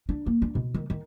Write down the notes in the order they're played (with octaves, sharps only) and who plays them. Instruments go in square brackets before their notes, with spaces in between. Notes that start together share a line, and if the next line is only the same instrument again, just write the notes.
[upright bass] D4
A#3
D4
B2
D#3
D#3